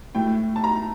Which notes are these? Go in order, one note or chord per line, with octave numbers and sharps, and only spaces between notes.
A2 A3 G5
A5
A#5